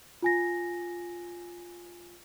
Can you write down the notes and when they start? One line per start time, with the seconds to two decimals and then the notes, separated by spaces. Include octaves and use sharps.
0.22 F4 G#5 A#6